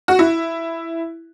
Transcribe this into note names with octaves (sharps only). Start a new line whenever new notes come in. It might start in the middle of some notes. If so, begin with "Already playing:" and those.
F#4
E4